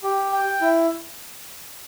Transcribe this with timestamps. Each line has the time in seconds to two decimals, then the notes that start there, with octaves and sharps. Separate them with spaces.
0.03 G4
0.33 G5
0.61 E4